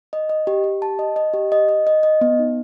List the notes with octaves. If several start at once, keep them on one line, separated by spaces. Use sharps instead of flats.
D#5
D#5
G4
G4
A5
D#5
D#5
G4
D#5
D#5
D#5
D#5
B3
D#4